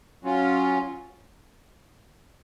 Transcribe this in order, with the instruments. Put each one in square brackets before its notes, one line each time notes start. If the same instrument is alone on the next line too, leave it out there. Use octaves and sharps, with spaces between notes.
[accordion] F#3 C#4 F4